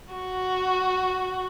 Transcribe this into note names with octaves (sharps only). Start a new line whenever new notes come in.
F#4